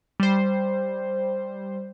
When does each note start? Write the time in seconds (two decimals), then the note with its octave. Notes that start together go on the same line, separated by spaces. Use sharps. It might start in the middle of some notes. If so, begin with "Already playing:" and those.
0.20 G3 C5